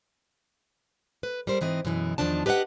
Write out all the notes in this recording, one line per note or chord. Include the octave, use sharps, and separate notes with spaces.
B4
G3 A#4 C5
G#2 E3 C4 D#5
F#2 B2 E3 G#3
E2 G2 D#3 F3 D4 A5
G4 B4 D#5 F5 F#5